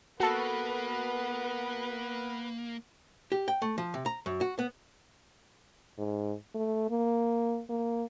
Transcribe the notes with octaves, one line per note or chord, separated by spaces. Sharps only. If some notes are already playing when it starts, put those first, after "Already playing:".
A#3 B3 F#4 A4 B4
G4
G5
A3
F3
C3
A#5
F#2
F#4
B3
G#2
A3
A#3
A#3